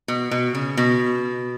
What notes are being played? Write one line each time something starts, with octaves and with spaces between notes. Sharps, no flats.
B2
B2
C#3
B2